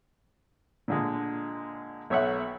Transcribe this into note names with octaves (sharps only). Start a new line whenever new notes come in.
A#2 D3 G#3
B1 C#5 E5 F#5